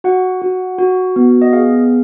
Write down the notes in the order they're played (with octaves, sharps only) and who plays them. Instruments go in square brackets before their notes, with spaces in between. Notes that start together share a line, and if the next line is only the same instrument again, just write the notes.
[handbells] F#4 F#5
F#4
F#4
B3
D#5
G#4 F5